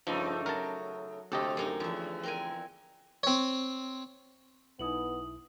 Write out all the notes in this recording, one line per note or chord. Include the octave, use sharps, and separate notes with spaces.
G2 C#3 F3 A3 D#4
F#3 A#4 A5
D2 C3 G4 A4 D#5
F#2 C#4 D#4
E2 F3 E5
C4 A#4 G#5
C4 C#5
B1 B3 D#4 E4 D#6 F#7